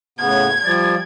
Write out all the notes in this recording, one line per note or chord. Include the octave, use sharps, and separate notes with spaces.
A2 C#3 B3 G#6
F3 G3 D5